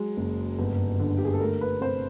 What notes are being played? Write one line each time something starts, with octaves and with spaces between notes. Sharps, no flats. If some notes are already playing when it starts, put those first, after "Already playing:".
Already playing: F#3 G#3
F#1
G1
D3
G4
G#4
A4
A3 A#4
B4
C3 C5